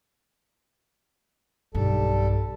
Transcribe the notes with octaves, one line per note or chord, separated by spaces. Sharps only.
B1 G2 G3 A4